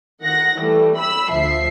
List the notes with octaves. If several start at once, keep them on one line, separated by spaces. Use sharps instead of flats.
D#3 F#5 A#6
E3 G3 A3
B5 E6 B6
D2 F3 E5 C7